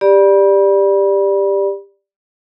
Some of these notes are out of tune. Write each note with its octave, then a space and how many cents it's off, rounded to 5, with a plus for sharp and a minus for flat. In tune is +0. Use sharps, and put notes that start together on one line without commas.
G4 +15 D5 +0 B5 -30